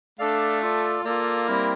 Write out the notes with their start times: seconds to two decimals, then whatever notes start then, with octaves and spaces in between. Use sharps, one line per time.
0.19 A3 D4 A4 D5 F5
0.62 F4 A4 D5
1.05 A#3 F4 A4 D5
1.48 G3 C4 E4 A#4